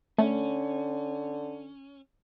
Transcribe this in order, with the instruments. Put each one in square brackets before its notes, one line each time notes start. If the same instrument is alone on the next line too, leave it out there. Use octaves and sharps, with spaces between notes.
[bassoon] D3 [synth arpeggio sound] A3 [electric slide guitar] C#4